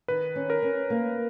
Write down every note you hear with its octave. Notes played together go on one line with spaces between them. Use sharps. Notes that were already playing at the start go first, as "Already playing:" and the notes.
D#3 B4
C#4
A#4
C#4
A#3